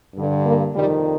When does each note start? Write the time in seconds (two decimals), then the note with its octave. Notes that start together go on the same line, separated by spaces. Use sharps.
0.15 G2 D3
0.45 A#3
0.74 F2 C3 D#3 G3